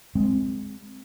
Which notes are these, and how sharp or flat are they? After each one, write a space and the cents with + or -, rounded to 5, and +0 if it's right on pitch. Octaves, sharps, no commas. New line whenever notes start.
G#3 +0 C4 +0